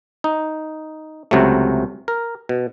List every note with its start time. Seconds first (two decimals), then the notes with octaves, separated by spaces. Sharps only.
0.24 D#4
1.31 C#2 C3 F#3 A3
2.08 A#4
2.49 B2